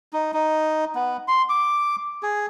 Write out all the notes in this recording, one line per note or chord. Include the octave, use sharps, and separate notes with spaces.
D#4
D#4
B3
C6
D6
G#4